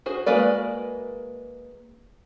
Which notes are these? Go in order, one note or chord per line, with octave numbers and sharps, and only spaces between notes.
F#4 G#4 C5
G#3 A#3 F#4 B4 D5